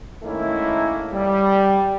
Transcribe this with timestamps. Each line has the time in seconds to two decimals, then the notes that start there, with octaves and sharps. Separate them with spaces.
0.23 G#2 D#3 A3 A#3 C#4 E4
1.13 G3